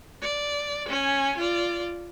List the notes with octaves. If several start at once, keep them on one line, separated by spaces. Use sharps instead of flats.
D5
C#4 G#5
F4 D5